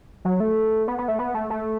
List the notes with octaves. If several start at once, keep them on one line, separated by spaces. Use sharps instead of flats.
F#3
A3
B3
B3
A3
B3
A3
A3